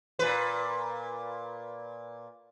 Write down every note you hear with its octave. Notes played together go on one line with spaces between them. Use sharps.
A#2 B4